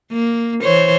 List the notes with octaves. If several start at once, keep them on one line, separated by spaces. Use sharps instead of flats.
A#3
E3 C5 C#5